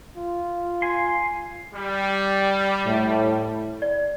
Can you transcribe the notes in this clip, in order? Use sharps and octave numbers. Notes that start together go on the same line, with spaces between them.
F4
G#5 C6
G3
A2
D5